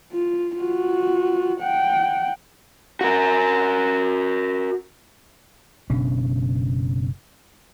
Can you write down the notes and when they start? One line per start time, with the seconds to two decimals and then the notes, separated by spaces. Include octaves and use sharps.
0.13 F4
0.57 F4 F#4
1.60 F#5 G5
3.01 F#4 A#4
5.90 F#1 B2 C#4 D4